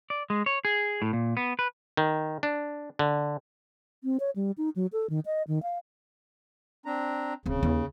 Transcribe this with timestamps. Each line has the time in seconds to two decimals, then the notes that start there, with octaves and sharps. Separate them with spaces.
0.10 D5
0.30 G#3
0.46 C#5
0.65 G#4
1.02 A2
1.13 A#2
1.37 B3
1.59 B4
1.97 D#3
2.43 D4
2.99 D3
4.04 C4
4.20 C#5
4.36 G3
4.58 D#4
4.76 F#3
4.93 A4
5.10 D#3
5.26 D#5
5.48 D#3
5.63 F5
6.86 C4 D4 A#5
7.46 D1 C#3 C4
7.63 D#2